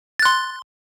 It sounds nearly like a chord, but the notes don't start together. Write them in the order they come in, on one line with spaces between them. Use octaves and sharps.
A6 F#6 C6